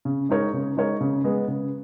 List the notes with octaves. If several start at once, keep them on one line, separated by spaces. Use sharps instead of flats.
C#3
G#3 D#4 A#4 C#5
C#3
G#3 D#4 A#4 C#5
C#3
G#3 B3
C#3